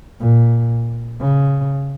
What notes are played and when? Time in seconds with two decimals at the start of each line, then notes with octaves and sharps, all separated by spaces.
0.20 A#2
1.20 C#3